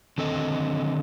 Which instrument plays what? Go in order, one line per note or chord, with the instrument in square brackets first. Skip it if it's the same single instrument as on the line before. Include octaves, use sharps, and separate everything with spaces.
[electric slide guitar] D3 D#3 C4 A4 D#5